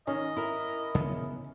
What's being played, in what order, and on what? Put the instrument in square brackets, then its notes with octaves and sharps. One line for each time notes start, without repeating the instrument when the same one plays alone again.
[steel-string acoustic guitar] D#3 [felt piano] C#4 [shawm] D#5
[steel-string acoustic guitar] E4 A#4
[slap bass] C#3 B3